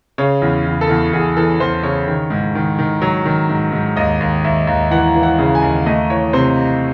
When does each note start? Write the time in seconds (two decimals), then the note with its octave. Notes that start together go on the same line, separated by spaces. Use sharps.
0.18 C#3 C#5
0.42 E2
0.66 E2
0.81 A4
0.89 E2
1.13 E2 G#4
1.37 E3 A4
1.60 E2 C5
1.83 C#3 C#5
2.08 D#3
2.30 G#2
2.55 D#3
2.79 D#3
3.02 F#3
3.25 D#3
3.49 G#2
3.72 G#2
3.96 D#2 D#5
4.20 D#2
4.44 D#2 E5
4.67 D#2
4.91 E3 F#5
5.15 E3
5.23 F#5
5.38 C#3
5.55 G#5
5.62 D#2
5.86 A3 D#5
6.10 E3 C#5
6.33 C3 C5